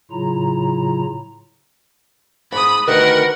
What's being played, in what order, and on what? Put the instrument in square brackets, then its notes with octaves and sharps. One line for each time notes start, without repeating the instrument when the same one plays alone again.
[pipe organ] A2 C#3 F#3 E4 F4 A#5
[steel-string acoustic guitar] G#2 [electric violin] B5 D#6
[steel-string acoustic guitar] D2 D#3 B4 [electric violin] A#4 F#5